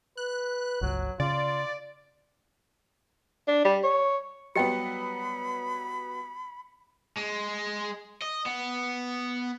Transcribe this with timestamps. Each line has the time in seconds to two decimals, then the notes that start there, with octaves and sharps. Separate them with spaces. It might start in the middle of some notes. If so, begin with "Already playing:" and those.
0.17 B4 F#6
0.81 G1 C#2 F#3
1.20 C#3 F4 D5
3.48 D4
3.65 G3
3.84 C#5
4.56 F#3 G3 B3 G4 D#5 G5 B5 C#7
7.17 G#3
8.22 D#5
8.46 B3